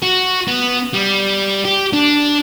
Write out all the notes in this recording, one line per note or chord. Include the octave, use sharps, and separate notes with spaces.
F#4
B3
G3
G4
D4